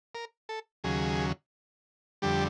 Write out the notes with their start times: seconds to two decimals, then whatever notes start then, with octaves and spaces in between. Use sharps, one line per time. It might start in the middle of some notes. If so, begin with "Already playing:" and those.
0.15 A#4
0.49 A4
0.84 D#2 C#3 F#3 G#4
2.22 F2 D3 G3 G4